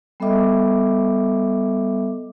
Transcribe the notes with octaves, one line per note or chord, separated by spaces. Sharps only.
G3 B3 A4 D#5 E5 D6